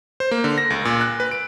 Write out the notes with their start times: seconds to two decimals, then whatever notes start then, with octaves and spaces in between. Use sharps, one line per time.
0.20 C5
0.31 A#3
0.44 D3
0.58 A#6
0.70 C#2
0.85 A#2
1.01 F#6
1.20 B4
1.31 D7